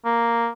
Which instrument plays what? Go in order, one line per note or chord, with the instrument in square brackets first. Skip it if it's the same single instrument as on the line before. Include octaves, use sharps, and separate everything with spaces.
[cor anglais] A#3